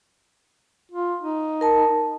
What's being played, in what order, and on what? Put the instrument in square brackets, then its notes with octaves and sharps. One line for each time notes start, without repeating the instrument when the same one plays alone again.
[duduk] F4
D#4
[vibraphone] A#4 A5